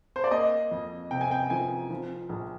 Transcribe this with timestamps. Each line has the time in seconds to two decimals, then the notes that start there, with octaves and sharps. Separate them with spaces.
0.16 C5
0.24 D5
0.31 A#3 D#5
0.72 F2
1.11 C3 G5
1.21 G#5
1.31 G5
1.50 F3 G#5
1.90 F3
2.29 A#1